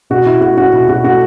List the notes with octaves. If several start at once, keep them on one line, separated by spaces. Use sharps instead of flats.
B2 F#4
B2 E4
A3 F#4
C#4 F#4
B2 E4
B2 F#4
A3 F#4